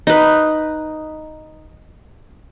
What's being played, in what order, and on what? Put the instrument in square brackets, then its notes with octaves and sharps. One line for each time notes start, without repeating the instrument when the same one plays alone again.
[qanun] D#4 B4